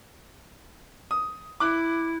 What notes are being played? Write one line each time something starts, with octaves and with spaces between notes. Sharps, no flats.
D#6
E4 D6 F#6